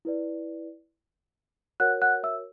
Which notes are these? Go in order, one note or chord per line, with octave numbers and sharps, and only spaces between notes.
E4 B4 D5
F#4 A#4 C#5 F#5 F#6
F#5 F#6
E5 E6